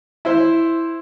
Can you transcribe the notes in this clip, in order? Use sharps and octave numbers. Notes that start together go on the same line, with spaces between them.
E4 C5